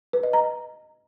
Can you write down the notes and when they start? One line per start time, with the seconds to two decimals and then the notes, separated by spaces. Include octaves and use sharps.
0.13 B4
0.23 D#5
0.33 A#5